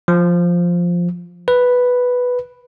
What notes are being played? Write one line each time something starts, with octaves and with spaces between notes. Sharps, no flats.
F3
B4